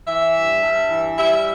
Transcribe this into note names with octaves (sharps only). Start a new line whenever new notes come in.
E3 E5
G2
G2
E3
G3 E5